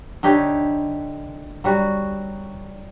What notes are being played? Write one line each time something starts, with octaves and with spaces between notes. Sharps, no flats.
D3 D#4 G4 C#5
F#3 G3 F#4